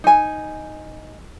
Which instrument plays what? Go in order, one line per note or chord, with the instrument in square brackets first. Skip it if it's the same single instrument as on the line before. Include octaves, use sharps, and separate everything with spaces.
[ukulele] D#4 G#5